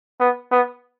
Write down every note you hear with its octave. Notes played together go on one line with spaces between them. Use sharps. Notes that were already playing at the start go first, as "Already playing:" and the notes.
B3
B3